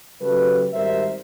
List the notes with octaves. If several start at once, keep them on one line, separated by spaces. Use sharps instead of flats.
C#3 F#3 A3 G4 A4 B4
G#1 G3 A#4 C5 E5